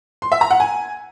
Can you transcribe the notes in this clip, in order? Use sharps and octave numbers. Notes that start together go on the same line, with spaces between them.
C6
E5
A#5
F#5
G#5